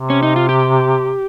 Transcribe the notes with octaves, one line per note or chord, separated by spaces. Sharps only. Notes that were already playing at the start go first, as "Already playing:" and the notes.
Already playing: C3
C#4
D#4
F4
G4